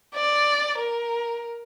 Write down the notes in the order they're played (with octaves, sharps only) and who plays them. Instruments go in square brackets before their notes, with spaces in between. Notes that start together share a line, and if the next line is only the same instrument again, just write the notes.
[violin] D5
A#4